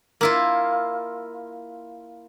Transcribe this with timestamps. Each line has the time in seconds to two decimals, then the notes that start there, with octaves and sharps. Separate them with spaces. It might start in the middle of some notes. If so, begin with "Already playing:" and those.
0.21 A#3 E4 F4